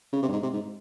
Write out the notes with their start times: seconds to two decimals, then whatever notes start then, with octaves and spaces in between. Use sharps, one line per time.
0.13 C#3
0.22 C3
0.28 G2
0.33 G#2
0.43 C3
0.53 G#2